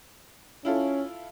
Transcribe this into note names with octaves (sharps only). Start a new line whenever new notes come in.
C#4 E4 F4 A4